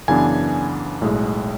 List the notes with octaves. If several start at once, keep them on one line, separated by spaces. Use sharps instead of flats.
F#2 C#3 E3 B3 D4 G#5
B1 A2 G#3